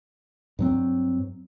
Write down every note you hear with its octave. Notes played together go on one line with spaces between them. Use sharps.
G2 F#3 C4